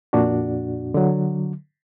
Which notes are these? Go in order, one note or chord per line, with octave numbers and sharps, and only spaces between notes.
F2 A#2 D4 F#4
D3 F#3